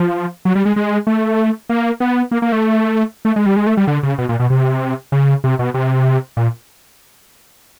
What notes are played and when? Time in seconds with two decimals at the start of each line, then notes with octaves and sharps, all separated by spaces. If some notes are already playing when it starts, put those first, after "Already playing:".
Already playing: F3
0.45 F#3
0.55 G3
0.65 G#3
0.76 G#3
1.07 A3
1.69 A#3
2.00 B3
2.31 A#3
2.42 A#3
2.52 A3
3.25 A3
3.36 G#3
3.46 G3
3.56 G#3
3.67 A3
3.77 G3
3.87 D3
4.03 C#3
4.18 B2
4.29 A#2
4.40 B2
4.50 C3
5.12 C#3
5.44 C3
5.59 B2
5.74 C3
6.37 A#2